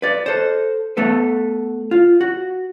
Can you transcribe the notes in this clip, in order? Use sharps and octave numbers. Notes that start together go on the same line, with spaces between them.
B4 D5
A4 C5
A3 B3 A4 B4
F4
F#4